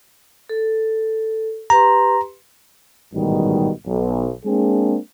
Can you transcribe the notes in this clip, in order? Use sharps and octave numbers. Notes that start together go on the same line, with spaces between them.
A4
G4 B4 A#5 C6
A1 G#2 B2 D#3 G3
B1
G#3 A#3 C4 D4 G#4